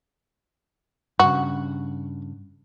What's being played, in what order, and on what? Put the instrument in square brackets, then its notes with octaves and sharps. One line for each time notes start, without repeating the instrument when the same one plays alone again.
[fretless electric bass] G2 C#3 [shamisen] F#4